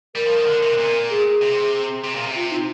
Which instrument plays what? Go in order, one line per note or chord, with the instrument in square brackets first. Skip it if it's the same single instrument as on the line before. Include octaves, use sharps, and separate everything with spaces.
[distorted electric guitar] G3 [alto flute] A#4
[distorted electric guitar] F3
D#3
D3
C3
A#2
[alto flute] G#4
[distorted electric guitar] C3
C3
A#2
C3
[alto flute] F4
D#4